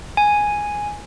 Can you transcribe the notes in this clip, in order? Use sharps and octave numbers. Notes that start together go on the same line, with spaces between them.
G#5